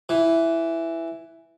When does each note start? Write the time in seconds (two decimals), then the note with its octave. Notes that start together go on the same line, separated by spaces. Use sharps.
0.09 E3